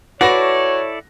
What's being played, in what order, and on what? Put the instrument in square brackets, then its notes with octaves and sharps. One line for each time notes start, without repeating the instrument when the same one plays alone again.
[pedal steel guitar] E4 A4 D5 [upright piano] F#4 B4 A#6 [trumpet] C#5 [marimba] F#5